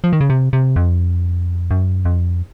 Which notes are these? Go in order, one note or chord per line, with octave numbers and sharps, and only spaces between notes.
F3
D#3
C#3
C3
C3
F2
F#2
F2